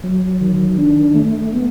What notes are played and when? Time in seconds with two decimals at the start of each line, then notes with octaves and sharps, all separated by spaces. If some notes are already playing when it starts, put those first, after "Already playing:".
0.04 F#3
0.41 D#3
0.78 D4
1.15 A3
1.53 B3